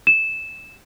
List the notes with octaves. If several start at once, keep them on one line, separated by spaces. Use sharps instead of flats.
E7